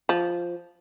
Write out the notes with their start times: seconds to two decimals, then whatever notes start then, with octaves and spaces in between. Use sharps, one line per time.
0.09 F3